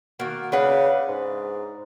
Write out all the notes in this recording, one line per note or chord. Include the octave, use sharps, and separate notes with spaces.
D#3 A#3 F#4
C#3 D4 B4 F#5
G#2